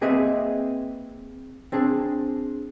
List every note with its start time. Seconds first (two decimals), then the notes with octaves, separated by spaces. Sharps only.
0.01 A#3 C4 G#4 B4 D#5 E5
1.72 C4 D4 G#4